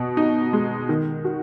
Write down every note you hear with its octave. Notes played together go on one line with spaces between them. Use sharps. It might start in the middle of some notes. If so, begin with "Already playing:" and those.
Already playing: B2
D#4
G#3
D#3
F#4